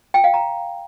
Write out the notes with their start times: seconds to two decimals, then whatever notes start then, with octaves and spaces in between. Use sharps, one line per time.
0.14 G5
0.24 F5
0.34 A#5